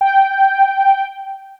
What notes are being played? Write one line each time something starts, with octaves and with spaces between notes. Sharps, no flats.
G5